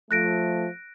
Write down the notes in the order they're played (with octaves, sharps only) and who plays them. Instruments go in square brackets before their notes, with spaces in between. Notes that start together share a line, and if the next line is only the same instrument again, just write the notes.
[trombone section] F3 A3 [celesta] F#6 A#6 D7